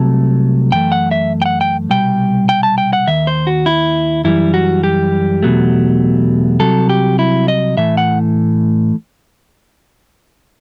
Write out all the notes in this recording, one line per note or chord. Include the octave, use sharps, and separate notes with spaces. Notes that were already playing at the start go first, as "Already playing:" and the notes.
Already playing: C2 C3 F#3 A3 A5
F#2 E3 A3 G5
F#5
E5
G5
F#5
G5
C2 B2 G3 G5
G5
A5
G5
F#5
D#2 D#3 E5
C5
F#4
E4
F#2 E3 G3 E4
F#4
G4
E2 B2 F#3 A3
C2 C3 F#3 A4
G4
E4
D#5
A2 E3 A3 E5
F#5